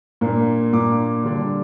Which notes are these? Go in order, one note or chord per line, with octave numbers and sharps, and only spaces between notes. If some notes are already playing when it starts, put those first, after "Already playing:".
A#2 A#3 D4
A#2 A#3 D4 D6
D3 G3 D4